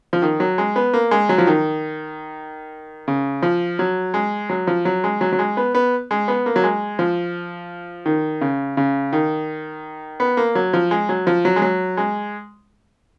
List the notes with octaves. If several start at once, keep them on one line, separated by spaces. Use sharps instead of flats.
F3
D#3
F#3
G#3
B3
A#3
G#3
F#3
F3
D#3
C#3
F3
F#3
G#3
F#3
F3
F#3
G#3
F#3
F#3
G#3
B3
B3
G#3
B3
A#3
F#3
G#3
F3
D#3
C#3
C#3
D#3
B3
A#3
F#3
F3
G#3
F#3
F3
F#3
G#3
F#3
G#3